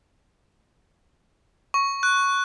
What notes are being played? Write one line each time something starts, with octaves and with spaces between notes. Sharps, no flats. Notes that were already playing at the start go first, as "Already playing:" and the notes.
C#6
F#6